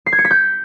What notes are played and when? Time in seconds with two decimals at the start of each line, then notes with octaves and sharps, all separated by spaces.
0.06 C7
0.12 G#6
0.19 C#7
0.25 B6
0.31 G6